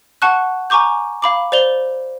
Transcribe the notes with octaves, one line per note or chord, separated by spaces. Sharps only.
F#5 A5 C#6 F#6
G#5 A#5 C#6 D6 G6
F5 B5 D6
C5 D5 F7 G7